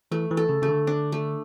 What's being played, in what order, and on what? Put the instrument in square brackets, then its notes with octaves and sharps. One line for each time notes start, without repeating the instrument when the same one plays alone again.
[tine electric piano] E3 [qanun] A3
[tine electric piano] E3
[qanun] A4
[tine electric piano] C#3
[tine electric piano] C#3 [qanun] A3
[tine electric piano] D3
[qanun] D4
A3